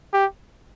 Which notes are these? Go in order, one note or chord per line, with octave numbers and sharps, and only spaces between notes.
G4